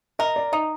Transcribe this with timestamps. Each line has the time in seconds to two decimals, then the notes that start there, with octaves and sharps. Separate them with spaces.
0.19 A#4 D#5
0.36 D5
0.52 D#4 D#5